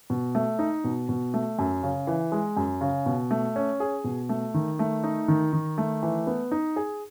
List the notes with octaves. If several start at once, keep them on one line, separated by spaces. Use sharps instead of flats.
B2
A3
D#4
B2
B2
A3
F#2
C#3
E3
G#3
F#2
C#3
B2
A3
C#4
G#4
B2
A3
D#3
A3
D#4
D#3
D#3
A3
E3
B3
D#4
G#4